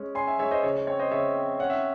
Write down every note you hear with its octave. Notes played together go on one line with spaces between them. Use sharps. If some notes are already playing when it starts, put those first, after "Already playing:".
Already playing: G#3 C#4
C#4 G#5 C6
E5 G#5
G#3 C#5 E5
C5 D#5
C#3 C#5
C#5
C4 C#5
C5 D#5
C#3 C#5 E5
C4
C#4 F#5
E5